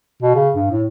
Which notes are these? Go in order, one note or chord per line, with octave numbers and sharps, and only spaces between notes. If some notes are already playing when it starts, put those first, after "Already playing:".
B2
C#3
G2
A2